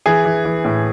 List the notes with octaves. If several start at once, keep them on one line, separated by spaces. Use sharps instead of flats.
E3 G#4
E3
E3
A2